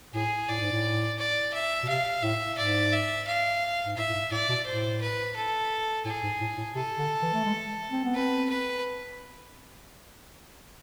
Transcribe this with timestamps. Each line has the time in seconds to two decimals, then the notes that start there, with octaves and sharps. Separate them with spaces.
0.14 A2 G#4
0.49 A2 D5
0.60 G#2
0.71 A2
1.18 D5
1.53 E5
1.83 B2
1.88 C3 F5
2.22 A2 E5
2.58 G#2 D5
2.92 E5
3.27 F5
3.85 G#2
3.97 A2 E5
4.10 A2
4.14 G#2
4.31 A2 D5
4.49 B2
4.66 A2 C5
5.01 B4
5.36 A4
6.05 A2 G#4
6.23 G#2
6.41 A2
6.58 A2
6.75 C3 A4
6.98 D3
7.22 E3
7.33 A3
7.45 G#3
7.91 C4
8.04 B3
8.14 C4 B4
8.49 B4